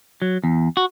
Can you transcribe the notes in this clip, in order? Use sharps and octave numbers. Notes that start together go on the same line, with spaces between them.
F#3
E2
F#4